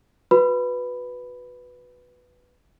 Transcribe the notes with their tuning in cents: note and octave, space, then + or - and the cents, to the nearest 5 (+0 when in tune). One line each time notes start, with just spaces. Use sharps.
F#4 -20 B4 +0 B5 +5